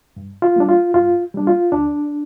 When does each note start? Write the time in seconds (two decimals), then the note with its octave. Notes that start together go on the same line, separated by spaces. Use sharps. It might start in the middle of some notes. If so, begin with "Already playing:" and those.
0.16 G2
0.42 F4
0.56 G3 A#3 D4
0.69 F4
0.94 G2 F4
1.34 G3 A#3 D4
1.47 F4
1.72 D2 D4